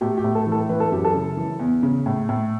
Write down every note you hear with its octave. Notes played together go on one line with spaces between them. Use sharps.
A2 G4
G4
A2
A4
E3
A4
E3 B4
A4
F#2 G4
A4
C#3
E3
E2
C#3
A2
A2